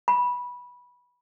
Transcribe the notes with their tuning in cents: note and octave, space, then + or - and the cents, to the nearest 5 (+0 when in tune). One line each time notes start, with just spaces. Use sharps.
B5 -15